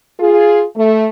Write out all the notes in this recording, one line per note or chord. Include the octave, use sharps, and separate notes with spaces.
F4 G#4
A3